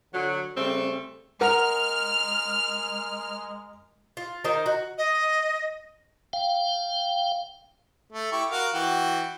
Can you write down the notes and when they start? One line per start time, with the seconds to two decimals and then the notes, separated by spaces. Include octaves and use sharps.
0.13 D3 F#3
0.56 C#3 G3 A3 C4
1.41 G#3 A#4 F#5 F6
4.17 F4
4.44 D#3 D#4 A#4 C5
4.66 F#4
4.98 D#5
6.33 F5 G5
8.13 A3
8.32 E4 G4 C#6
8.51 F#4 A#4 F5
8.74 E3 F#4 G5